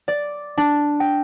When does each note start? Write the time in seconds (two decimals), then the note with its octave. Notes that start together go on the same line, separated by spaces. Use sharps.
0.08 D5
0.58 D4
1.00 G5